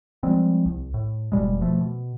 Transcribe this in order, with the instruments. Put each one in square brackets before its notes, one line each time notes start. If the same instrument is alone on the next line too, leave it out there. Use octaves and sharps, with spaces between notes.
[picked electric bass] F3 G3 G#3 C4
C2
A2
F1 B2 G3 G#3
B2 F3 A3
B2